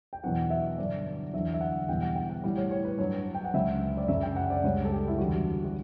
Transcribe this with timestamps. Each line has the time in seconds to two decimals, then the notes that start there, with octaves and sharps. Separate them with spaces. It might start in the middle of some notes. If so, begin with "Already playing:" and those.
0.13 G5
0.24 E2 B2 F#3 F#5
0.50 E5
0.78 G2 D3 F#3 D5
1.33 E2 D3 F#3 E5
1.54 E5
1.61 F#5
1.88 E2 B2 G3 G5
2.03 F#5
2.16 G5
2.30 F#5
2.44 A2 G3
2.57 C#5
2.71 C#5
2.85 B4
2.99 G2 F#3 C#5
3.35 G5
3.44 F#5
3.54 C#2 C#3 F#3 E5
3.97 D5
4.08 F#2 C#3 F#3 E5
4.23 G5
4.36 F#5
4.50 D5
4.64 C#2 C#3 G3 C#5
4.85 A4
4.92 G4
5.08 E4
5.19 E2 D3 G3 F#4
5.65 F#4